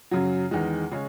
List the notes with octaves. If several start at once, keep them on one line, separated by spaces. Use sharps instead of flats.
F#2 C#3 F#3
E2 D#3 G#3
C#3 G#3 C#4